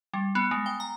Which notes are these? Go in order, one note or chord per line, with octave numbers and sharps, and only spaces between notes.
G3
B3
G#3
G5
A#5